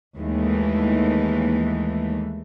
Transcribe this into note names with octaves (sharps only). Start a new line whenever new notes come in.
D#2 E3 G#3 A3